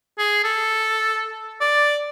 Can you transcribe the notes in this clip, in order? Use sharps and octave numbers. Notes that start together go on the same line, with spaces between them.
G#4
A4
D5